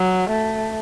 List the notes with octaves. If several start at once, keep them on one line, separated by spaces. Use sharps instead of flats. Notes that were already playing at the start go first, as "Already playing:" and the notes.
Already playing: F#3
A3